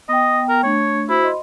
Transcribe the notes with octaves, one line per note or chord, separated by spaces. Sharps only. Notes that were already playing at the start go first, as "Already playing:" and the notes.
B3 D#5 G5
A#4
A3 D4 C#5
E4 F#4 C5 B5
D#5 C6